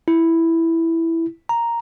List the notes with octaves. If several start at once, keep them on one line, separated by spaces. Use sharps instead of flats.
E4
A#5